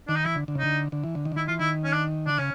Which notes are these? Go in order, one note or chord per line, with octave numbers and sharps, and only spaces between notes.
D#3 D4
D#4
E3 E4
D3
D3
C#3
D3 D#4
D3
E3
D3
D#3
D3
D#3 E4
E3 F4
D#3 E4
C#4
D4
D3 D4
C#3 C#4